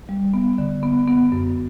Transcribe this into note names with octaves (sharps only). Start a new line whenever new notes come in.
G3
B3
D3
B3
B3
F#2